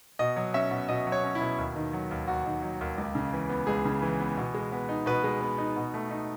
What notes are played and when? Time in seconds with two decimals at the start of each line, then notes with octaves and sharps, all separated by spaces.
0.19 B2 D#5
0.36 F#3
0.54 C#4 E5
0.71 B2
0.89 B2 D#5
1.07 F#3
1.12 C#5
1.24 C#4
1.35 E4
1.41 B2
1.58 D#2
1.76 D#3
1.93 F#3
2.11 D#2
2.28 D#2 F#4
2.46 D#3
2.62 F#3
2.81 D#2
2.98 C#2
3.15 C#3
3.33 E3
3.49 B3
3.67 C#2 G#4
3.85 C#3
4.02 E3
4.20 B3
4.37 B2
4.54 G#3
4.72 B3
4.89 D#4
5.06 B2 B4
5.24 G#3
5.41 B3
5.58 D#4
5.76 B2
5.94 A3
6.11 D#4